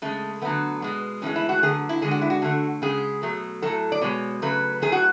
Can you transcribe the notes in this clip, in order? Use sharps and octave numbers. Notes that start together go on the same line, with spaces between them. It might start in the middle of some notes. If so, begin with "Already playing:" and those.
C#3 G#3 A3
D3 F#3 A3 B3
B2 G#3
A2 E3 G#3 C#4
E4
F#4
D3 F#3 A3 G#4
E4
D3 G#3 G#4
F#4
E4
F#4
D3 A3
C#3 G#3 G#4
B2 F#3 A3
A2 F#3 A3 A4
D5
B2 G#3 C#5
C#3 F#3 A3 B4
A2 F#3 A3 G#4
F#4